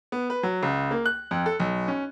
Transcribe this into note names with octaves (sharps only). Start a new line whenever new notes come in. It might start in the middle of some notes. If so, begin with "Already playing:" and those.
B3
B4
F#3
C#2
A#3
F#6
F2
A4
B1
C#4